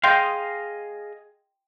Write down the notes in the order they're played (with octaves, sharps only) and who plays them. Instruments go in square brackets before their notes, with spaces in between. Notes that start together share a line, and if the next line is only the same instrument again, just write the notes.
[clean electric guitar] G#4 D#5 F5 [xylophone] G5 C6 G6